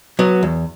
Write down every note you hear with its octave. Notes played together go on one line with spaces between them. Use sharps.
F#3 B3
E2